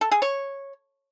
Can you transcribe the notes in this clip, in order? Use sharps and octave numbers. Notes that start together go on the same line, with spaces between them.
A4
G#4
C#5